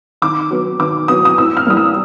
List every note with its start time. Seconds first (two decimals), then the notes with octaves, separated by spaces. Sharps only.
0.22 D#3 D6
0.51 F#3 B3
0.80 D#3 D6
1.08 F#3 B3 D#6
1.25 D#6
1.38 A2 E6
1.57 F6
1.67 E3 G3 A#3 D#6
1.77 E6